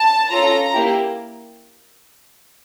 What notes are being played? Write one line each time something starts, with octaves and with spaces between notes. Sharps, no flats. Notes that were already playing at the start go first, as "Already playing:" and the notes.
Already playing: A5
C#4 F4 A4 A#5
A#3 E4 G4